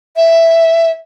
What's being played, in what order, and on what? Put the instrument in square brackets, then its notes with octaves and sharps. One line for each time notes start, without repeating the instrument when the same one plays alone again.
[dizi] E5